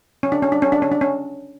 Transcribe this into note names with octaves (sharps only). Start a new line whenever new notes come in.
C#4
D4
C#4
D4
C#4
D4
C#4
D4
C#4